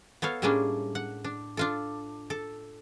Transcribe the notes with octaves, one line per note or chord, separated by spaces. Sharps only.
B3 A4 C#5 F5
A2 G3 G#3 A#3 C#4 D4
F#5
D4
D4 F4 A4
A4